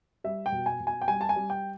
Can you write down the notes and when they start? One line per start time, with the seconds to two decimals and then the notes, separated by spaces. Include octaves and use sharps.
0.24 G3 E5
0.46 G5
0.52 B2
0.66 G#5
0.80 B2
0.87 G#5
1.02 G5
1.08 G3 G#5
1.21 A5
1.29 G#5
1.36 G3
1.50 G5